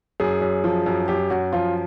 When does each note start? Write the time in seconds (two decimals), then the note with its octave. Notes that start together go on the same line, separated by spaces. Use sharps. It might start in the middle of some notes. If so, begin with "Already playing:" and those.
0.20 F#2 G#4
0.41 F#2
0.64 F3
0.86 F#2
1.08 F#2 G4
1.30 F#2 F#4
1.53 F3 F4